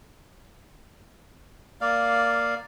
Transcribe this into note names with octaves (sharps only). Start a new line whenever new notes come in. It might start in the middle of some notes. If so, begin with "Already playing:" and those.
A#3 D5 F5